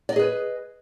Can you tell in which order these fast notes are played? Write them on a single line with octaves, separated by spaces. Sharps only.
D5 D#5 G#4 B4